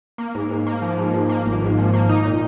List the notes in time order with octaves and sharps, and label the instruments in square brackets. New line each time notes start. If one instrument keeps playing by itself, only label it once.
[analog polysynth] A#3
G#2
G#2
A#3
F3
G#2
G#2
A#3
G#1
G#2
F3
A#3
D#4
A#2